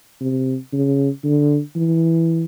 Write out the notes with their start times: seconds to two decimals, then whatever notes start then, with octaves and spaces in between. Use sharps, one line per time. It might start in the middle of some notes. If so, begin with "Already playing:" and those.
0.21 C3
0.73 C#3
1.24 D3
1.76 E3